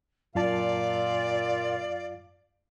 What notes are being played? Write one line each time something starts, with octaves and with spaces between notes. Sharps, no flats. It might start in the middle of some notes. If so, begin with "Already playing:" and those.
F#2 A#2 F4 D5 F5 A5